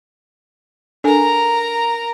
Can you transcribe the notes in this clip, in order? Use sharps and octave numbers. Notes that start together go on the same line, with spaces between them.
D4 A4 A#4 G#5 A#5